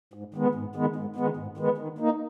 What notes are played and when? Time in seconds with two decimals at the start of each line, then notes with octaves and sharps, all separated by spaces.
0.14 G#2
0.34 D#3 G#3 B3
0.55 G#2
0.75 D#3 G#3 B3
0.96 G#2
1.16 D#3 G#3 B3
1.37 G#2
1.57 D#3 G#3 B3
1.78 D#3
1.99 A#3 D#4